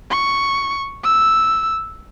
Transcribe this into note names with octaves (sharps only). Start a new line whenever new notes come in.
C#6
E6